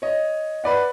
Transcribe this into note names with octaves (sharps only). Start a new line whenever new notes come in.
C#5 D#5
B4 D5 F#5